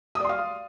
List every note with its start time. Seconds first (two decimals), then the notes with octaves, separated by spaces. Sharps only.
0.15 D#6
0.20 D5
0.25 C6
0.29 F5